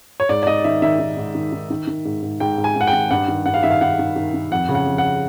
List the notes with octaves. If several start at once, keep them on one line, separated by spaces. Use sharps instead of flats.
C#5
G#2 D5
D5
G#2 D#5
D#3 E5
D#3 E5
D#3
G#2
D#3
D#3
D#3
D#3
G#2
G#2
G#2 G5
G#2
G#5
G#2 F#5
G5
D#3
G2 F#5
D#3
G2 F#5
F5
D#3 E5
F5
D#3 F#5
D#3
D#3
D#3
F2 F#5
C#3
F#5
F2
F#5